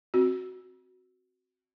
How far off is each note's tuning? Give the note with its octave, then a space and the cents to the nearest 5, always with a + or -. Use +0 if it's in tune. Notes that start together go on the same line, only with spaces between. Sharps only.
C4 +0 F#4 +0